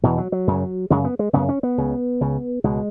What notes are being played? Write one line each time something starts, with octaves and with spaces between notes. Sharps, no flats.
E2 B2 E3
F#3
F#3
F#2 C#3
F#2 C#3 G#3
B3
G#3
F#2 C#3 B3
C#4
B3
C#2 C#3
C#2 C#3
C#2 B2 G#3